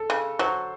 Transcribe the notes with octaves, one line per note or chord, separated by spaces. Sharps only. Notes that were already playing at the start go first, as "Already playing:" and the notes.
Already playing: A4
C#3
F#3 C5